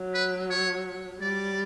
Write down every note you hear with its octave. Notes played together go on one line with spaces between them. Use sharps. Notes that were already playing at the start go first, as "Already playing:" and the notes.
Already playing: F#3
B4
C#5
G3 D5